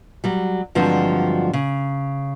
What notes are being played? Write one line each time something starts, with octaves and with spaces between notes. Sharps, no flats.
F#3 G3
G2 D3 F3 F#3 G#3 C4
C#3